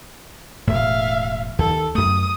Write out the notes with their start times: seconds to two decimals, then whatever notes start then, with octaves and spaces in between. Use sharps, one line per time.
0.67 E1 A2 E5 F5
1.59 D#2 A4
1.95 F#2 A3 D#6